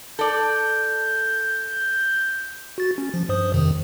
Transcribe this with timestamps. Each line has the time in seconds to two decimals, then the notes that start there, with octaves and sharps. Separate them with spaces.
0.19 A4 D5 G6
2.78 F#4 A6
2.98 C#4
3.14 F3
3.29 G2 C5 D#6
3.54 F2 C3 D#3